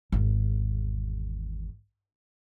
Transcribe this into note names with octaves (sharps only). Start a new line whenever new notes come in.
G#1 E2